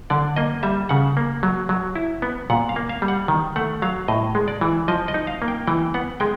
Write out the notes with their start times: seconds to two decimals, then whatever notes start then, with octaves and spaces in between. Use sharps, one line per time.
0.10 D3 D5
0.36 A#3 D#5
0.63 G3 E5
0.89 C#3 F#5
1.17 A#3
1.43 F#3
1.69 F#3
1.95 E4
2.22 B3
2.50 A#2 F#5
2.69 F5
2.76 A#3
2.89 F5
3.02 G3
3.08 F#5
3.28 D#3
3.56 A3 F#5
3.82 F#3 F5
4.08 A2 D#5
4.35 G#3
4.48 D5
4.61 E3
4.88 F3 D#5
5.08 D#5
5.14 D#4
5.27 F5
5.42 A#3
5.48 G5
5.67 E3 G5
5.94 B3 F#5
6.20 G#3 G5